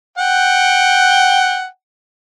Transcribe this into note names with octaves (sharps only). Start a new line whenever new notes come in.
F#5 G5